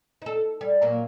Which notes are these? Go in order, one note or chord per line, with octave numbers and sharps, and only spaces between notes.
D#4 A4
G3
A#2 F#3 A#3